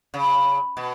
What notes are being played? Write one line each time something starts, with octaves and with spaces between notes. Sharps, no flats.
C#3
B2